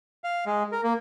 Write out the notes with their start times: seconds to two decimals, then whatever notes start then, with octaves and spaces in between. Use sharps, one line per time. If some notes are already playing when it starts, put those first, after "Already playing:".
0.24 F5
0.46 G#3
0.72 A#4
0.84 A#3